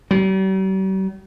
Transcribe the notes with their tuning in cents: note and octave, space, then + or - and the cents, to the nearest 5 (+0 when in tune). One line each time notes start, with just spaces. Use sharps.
G3 -45